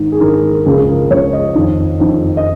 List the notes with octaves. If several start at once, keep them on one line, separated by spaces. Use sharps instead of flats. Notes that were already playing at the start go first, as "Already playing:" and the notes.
Already playing: G#2 D#3
G#4
G#2 D#3 A#4
A#4
A#4
C#2 C#3 F3 G#4
G#4
A#4
C#2 C#3 F3 C#5
D#5
F2 D#3
F2 D#3
D#5